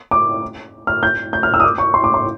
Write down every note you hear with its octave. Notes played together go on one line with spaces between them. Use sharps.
D6
F6
G6
G6
F6
E6
D#6
D6
C#6
C6
D6
C6